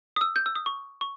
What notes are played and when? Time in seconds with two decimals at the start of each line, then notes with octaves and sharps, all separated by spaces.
0.16 D#6
0.21 E6
0.36 G6
0.46 E6
0.55 D#6
0.66 C#6
1.01 C#6